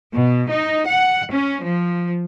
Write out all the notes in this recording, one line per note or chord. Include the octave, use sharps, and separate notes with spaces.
B2
D#4
F#5
C#4
F3